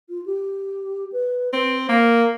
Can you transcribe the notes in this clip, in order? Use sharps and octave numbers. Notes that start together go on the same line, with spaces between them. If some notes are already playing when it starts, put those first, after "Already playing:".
F4
G4
B4
C4 B4
A#3 A#4